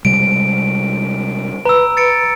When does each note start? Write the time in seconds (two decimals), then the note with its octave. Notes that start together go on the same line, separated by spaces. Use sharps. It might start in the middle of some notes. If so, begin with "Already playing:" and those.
0.05 C3 G3 G#3 D7
1.65 B4 A#5 E6
1.97 A6 C#7 D7